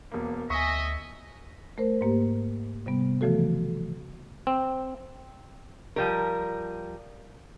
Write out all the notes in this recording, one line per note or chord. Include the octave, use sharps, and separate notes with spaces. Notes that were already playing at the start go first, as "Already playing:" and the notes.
E1 A#3
D2 D#5 E5 G#5 C#6
A3 A#4 C5
G#2 A#3 G4
C3 G3 B3
C#3 E3 F3 A3 F#4 A4
C4
F3 G3 A#4